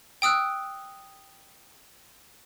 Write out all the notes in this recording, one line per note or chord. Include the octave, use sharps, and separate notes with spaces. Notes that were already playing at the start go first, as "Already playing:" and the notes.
G5 D#6 E6 F#6